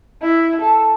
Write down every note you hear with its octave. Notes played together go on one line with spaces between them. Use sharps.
E4
A4